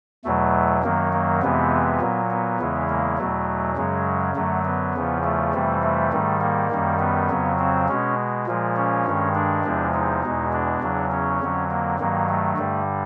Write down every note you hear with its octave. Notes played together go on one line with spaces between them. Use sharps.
E2 B2 F#3 A3
F#2 D#3 F#3 A#3
A#3
F2 C3 E3 G#3 B3
A#2 F#3
B3
E2 C#3 E3 G#3
A#3
E2 B2 F#3 A3
F#2 C#3 F#3 G#3
F#2 D3 F#3 A3
B3
E2 C#3 F3
A3
F2 C3 E3 G3
A3
G#2 D#3 G3
A#3
F#2 D#3 G3
B3
F2 C#3 F#3
C4
B2 G#3 C#4
A#2 F3 G#3
C#4
G2 D#3 G#3
D4
E2 C3 F3 G#3
D#4
E2 B2 G#3
D4
E2 C#3 F#3
C#4
F2 D3 F#3
A#3
G2 D#3 F#3 A#3
A3
G2 D3 G3